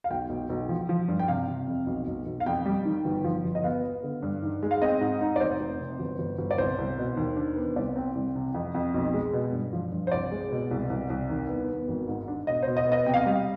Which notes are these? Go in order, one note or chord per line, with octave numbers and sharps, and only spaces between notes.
F5
B1 G5
B1
B1
F3
F3
G2
G5
C3 F5
C3
F2
B1
B1
B1
F5
F2 G5
G3
D#3
G1
F3
G1
D#5
B3 F5
B3
D3
G2
D#3
G#3
F5
C4 D#5
G#2
D#4
D5
F1 C5
F1
C3
G1
G1
G1
D5
C2 C5
C2
B2
D#2
D4
B3
C2 D5
C4
C2
C3
F2
F2
B1
G#3
B2
G2
F3
G2
C5
C2 D5
G#3
B2
C2
C2
C2
D#2
B3
B3
G#1
G#2
D4
B2 D#5
B2 C5
D#5
B3
D#5
C3 G5
F5
D#5
G3 F5